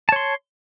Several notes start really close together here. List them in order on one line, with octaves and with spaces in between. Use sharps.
A5 C#5 C6